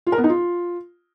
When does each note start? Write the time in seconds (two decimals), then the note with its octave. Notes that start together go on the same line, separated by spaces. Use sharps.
0.07 F4
0.12 A#4
0.18 B3
0.24 D#4
0.29 F4